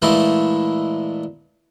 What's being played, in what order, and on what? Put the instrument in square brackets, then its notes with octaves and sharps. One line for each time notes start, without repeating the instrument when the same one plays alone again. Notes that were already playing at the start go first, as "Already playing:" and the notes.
[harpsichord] A#2 E3 G#3 A3 E4